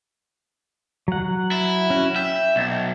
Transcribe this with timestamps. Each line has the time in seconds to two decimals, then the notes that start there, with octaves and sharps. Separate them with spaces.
1.08 F#3 F#5
1.52 E4
1.90 C#4 F#4
2.16 E5 G5
2.56 B1